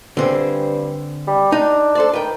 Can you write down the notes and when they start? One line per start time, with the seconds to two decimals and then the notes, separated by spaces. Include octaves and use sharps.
0.17 G2 D3 C4 G#4
1.27 G3
1.52 D4 D#4
1.95 A4 C5 D5
2.13 D#3 B4 G5